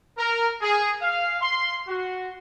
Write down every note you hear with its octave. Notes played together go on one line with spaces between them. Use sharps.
A#4
G#4
F5
C6
F#4